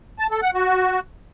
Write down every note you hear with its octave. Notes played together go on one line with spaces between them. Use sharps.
A5
A4
F#5
F#4